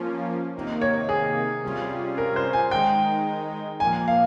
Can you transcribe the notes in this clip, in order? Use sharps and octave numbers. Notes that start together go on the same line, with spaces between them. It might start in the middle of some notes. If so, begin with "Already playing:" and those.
Already playing: F3 A#3 C#4 F4
C3 D#3 A#3 D#4
C#5
G#4
C3 G3 C#4 F4
A#4
C5
G#5
D#3 G#3 D#4 G5
A#2 F3 A#3 G#5
F5